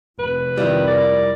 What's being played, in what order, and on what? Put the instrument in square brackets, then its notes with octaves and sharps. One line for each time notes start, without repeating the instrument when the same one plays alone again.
[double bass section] F1 [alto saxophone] B4
[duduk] D#3 [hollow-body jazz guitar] G3 E4 F4
[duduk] A#4 [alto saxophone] D5